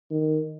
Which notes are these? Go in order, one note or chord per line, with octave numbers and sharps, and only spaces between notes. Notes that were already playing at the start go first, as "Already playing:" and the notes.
D#3